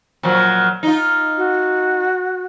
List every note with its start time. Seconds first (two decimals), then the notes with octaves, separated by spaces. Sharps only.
0.23 A#2 F3 F#3
0.83 D#4 F4
1.38 F#4